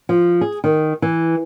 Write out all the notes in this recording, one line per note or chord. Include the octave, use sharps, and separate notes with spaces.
F3
G#4
D#3
E3